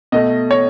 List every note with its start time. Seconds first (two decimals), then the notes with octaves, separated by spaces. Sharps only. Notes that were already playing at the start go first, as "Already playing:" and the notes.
0.12 B2 A3 D#5
0.51 C#5